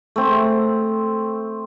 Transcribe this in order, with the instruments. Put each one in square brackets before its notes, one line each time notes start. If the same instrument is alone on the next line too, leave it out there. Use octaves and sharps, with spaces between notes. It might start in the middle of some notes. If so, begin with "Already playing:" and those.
[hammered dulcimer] A3 C4